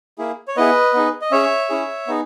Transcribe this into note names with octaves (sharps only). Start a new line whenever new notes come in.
A#3 E4 G#4
C#5
B3 E4 G#4 B4 D#5
B3 D#4 G#4
D#5
C#4 G#4 C#5 E5
C#4 E4 G#4
B3 D#4 G#4